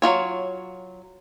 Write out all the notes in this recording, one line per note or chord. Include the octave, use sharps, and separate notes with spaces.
F#3 E4 F4 C#5